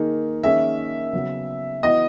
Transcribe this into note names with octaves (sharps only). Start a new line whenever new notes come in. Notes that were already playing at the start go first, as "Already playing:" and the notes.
Already playing: D#3 A#3 D#4 G#4
D#3 A#3 C#4 G#4 E5
C#3 F#3 B3 F#4
E3 B3 F#4 D#5